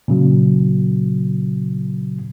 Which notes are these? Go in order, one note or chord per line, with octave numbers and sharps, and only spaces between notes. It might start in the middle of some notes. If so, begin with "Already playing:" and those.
A#2 C#3 F#3